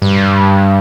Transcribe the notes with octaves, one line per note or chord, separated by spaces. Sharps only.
G2